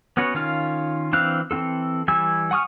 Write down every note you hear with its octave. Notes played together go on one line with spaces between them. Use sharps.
B3 C#4 F#4 B4 C#5
D#3 C#4 F4 F5
E3 C4 D4 F5 F#6
E3 C4 F4 A4
E3 G3 G#5 E6
F#5 G#5 C#6 D#6 F6